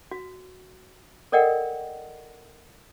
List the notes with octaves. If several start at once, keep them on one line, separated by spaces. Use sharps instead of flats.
F#4
A4 A#4 D5 D#5 F#5 G5